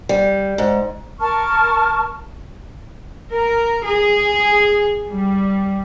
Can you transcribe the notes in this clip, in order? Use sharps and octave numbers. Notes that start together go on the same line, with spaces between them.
G3
G#2
A#4 A5 C#6 F6
A#4
G#4
G3